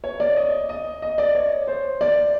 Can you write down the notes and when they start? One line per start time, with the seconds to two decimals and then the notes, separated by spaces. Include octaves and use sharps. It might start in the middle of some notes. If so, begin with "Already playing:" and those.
0.04 C#5
0.20 D5
0.36 D#5
0.69 D#5
1.02 D#5
1.18 D5
1.35 C#5
1.68 C5
2.01 D5